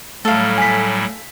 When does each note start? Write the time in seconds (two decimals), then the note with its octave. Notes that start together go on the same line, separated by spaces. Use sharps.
0.25 A2 F#3 G3 A3 A4 F5
0.58 G#5 B6